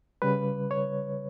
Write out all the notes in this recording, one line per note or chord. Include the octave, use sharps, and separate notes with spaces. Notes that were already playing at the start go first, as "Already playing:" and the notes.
C#3 G3 B4
C#5